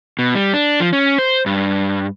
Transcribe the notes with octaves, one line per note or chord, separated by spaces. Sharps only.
B2
G3
D4
F3
C#4
C5
G2